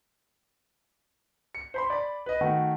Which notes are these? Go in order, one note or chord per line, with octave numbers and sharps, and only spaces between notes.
C#7
C5 B5 C6
D5 B5
B4 D#5
D#3 A3 F#4